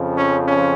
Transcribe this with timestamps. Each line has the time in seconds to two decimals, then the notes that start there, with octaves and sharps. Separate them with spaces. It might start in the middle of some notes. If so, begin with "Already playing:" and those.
Already playing: F2 C#3 F3
0.17 C#4
0.45 C#4